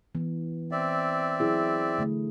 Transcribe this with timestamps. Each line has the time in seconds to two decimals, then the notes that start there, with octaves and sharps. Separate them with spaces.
0.15 E3 B3
0.71 C4 D5 E5
1.40 F#3 E4 G#4
1.98 D3 A3